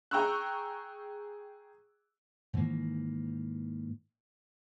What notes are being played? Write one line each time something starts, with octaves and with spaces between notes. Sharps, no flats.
G#4 G5 A#5 C#6 E6 F#6
G#2 D#3 E3 A#3